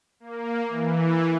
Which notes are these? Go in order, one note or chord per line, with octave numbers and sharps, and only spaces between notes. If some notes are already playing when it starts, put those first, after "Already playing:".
A#3
E3